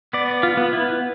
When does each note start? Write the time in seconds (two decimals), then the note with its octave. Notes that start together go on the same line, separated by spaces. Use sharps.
0.13 B3 D5
0.43 F4
0.57 B3
0.73 E4